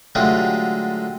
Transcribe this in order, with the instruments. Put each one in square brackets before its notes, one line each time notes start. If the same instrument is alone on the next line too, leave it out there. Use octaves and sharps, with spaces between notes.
[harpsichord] D3 F#3 G#3 A3 F4 G4